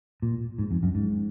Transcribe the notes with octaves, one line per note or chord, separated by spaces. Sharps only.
A#2
G#2
F2
F#2
G#2